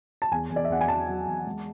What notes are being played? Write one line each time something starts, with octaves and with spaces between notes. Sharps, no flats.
A5
E2 G#5
E2
D5
E5
E2 F#5
G#5
E2 A5
F#3
E2
G#3